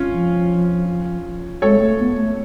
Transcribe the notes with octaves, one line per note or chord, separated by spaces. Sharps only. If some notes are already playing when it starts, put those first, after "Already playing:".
Already playing: C#4 F4
F3
G#3 A4 C#5
A3
B3
A3